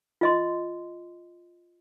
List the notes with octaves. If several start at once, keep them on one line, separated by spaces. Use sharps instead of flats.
F4 D#5 C6